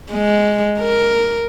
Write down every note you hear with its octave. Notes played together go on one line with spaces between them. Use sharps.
G#3
A#4